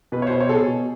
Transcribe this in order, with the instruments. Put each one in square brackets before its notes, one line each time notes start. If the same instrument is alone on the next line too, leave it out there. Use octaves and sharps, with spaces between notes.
[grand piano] B2 B4
C#5
B2 C5
C#5
B2 G#4 A4
B2